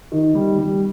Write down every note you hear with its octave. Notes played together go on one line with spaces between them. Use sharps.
D#3
G3
G3